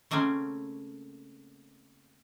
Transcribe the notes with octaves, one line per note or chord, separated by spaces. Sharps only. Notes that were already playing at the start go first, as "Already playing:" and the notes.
C#3 A3 A#3 C4 C#4